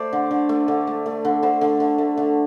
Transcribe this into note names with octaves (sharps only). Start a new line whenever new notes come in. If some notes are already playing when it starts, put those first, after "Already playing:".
Already playing: A3 C5 D5
D3
D3
A3
D3
A3
A3
D3
D3 C5
D3
D3
A3
D3